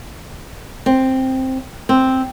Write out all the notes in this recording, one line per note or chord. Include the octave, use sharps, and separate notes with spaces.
C4
C4